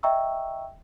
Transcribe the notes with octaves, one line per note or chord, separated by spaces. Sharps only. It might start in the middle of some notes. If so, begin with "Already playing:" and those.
D#5 E5 G5 A#5 C#6 E6